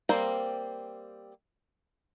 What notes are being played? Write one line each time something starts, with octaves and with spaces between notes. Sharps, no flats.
G3 A#3 C4 C5 A#5